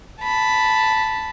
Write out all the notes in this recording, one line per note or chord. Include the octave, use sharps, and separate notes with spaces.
A5 B5